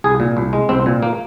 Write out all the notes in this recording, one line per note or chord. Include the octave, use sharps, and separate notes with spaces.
C2 G#4
A#2
C2
G#3
C2 C4
A#2
A#3